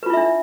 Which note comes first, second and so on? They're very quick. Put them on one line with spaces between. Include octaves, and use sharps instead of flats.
B4 F4 E4 E5 D4